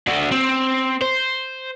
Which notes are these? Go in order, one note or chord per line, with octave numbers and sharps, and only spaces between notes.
D4 F#4
C4
C5